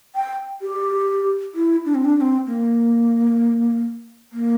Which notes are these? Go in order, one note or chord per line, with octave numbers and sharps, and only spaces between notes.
G5
G4
E4
D4
C4
D4
D4
C4
A#3
A#3